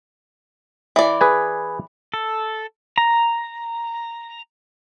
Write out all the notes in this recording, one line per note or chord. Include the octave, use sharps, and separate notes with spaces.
E3 D5
G#4 B4 G#5
A4
A#5